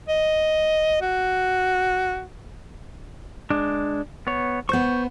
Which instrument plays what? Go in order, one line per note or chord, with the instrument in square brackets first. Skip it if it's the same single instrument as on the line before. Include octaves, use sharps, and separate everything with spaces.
[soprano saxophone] D#5
F#4
[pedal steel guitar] G#3 D4
B3 C#5
[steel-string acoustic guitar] B3 C5 [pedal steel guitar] C#6 G6